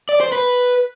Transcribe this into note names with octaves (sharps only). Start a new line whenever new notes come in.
D5
C5
B4